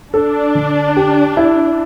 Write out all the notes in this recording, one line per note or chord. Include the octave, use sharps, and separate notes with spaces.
D4 A4
D3
G4
E4